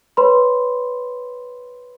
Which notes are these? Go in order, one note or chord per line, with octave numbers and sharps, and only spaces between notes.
B4 C#5 B5 C6